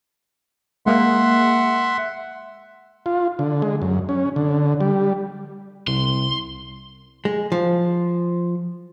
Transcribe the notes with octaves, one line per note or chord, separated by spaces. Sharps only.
G#3 A#3 E5 F#5 C6
F4
D3
G#3
F#2
C#4
D3
G3
C2 C6
G#3
F3